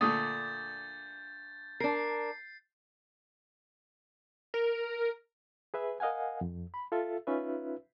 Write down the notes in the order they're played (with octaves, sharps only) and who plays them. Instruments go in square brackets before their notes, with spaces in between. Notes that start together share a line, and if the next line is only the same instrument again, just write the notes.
[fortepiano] A#2 D3 A3 [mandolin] D#6 [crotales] G6 A6
[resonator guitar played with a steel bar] D4 A#4 [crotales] C7
[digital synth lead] A#4
[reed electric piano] G#4 B4 E5
A#4 D#5 F5 F#5 G#5
F2
B5
F4 A4 E5
C#4 D#4 F4 B4 E5